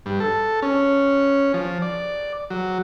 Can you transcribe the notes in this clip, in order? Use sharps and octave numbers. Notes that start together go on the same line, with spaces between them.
G2
A4
C#4
F3
D5
F#3